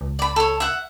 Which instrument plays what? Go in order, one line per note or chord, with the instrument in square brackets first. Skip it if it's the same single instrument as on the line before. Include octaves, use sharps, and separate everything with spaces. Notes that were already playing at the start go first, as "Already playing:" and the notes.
[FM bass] C#2
[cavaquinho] D5 B5
A4 C#5
E5 F#5